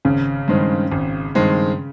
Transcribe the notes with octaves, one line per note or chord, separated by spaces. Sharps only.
G#1 C#3
G2 D#3 G#3 C4
G#1
G2 D#3 G#3 C4